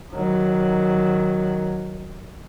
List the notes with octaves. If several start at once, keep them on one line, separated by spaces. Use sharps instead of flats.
D#3 F#3